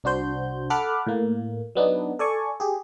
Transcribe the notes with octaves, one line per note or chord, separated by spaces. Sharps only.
C2 D4 F#4 C5 G6
A4 F#5 B5 D6 F6 F#6
A2 A#3
F#3 B3 D4 D#4
A4 D5 G#5 C#6
G4 G#4